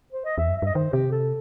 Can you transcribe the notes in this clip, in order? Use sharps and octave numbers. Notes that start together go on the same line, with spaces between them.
C5
D#5
E2 E5
F#2
E5
G2
D#5
D#3 C5
C3 G4
A4